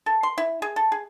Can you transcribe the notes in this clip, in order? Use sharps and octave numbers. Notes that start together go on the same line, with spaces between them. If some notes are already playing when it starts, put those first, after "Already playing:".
A4
C6
E4
G#4
A4
G#4